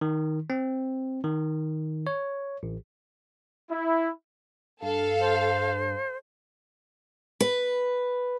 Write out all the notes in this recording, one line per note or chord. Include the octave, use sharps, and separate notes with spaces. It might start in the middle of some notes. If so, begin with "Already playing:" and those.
D#3
C4
D#3
C#5
A1
E4
G2 A4 F5
C5
B4